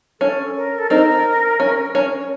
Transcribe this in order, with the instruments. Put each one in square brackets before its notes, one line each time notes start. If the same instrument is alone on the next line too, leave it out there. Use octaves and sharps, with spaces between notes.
[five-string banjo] C#4 [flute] A4
[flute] A#4
A4
[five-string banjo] C4 D#4 [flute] A#4
[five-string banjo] C#4
C#4